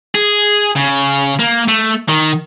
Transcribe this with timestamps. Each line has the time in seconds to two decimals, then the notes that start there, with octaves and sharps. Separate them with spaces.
0.15 G#4
0.76 C#3
1.40 A#3
1.68 A3
2.09 D#3